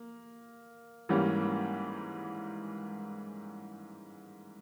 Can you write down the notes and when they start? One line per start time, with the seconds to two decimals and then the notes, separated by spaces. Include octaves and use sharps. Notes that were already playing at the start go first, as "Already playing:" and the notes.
Already playing: A#3
1.09 G#2 E3 G3 A#3 C#4